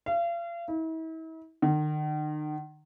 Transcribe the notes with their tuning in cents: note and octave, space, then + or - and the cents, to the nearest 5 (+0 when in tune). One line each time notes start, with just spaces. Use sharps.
F5 -35
E4 -40
D#3 -40